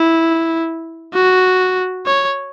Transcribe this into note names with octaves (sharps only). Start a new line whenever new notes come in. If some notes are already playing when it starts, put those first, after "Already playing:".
Already playing: E4
F#4
C#5